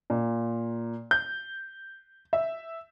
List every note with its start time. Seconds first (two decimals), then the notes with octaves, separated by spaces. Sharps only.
0.10 A#2
1.11 G6
2.33 E5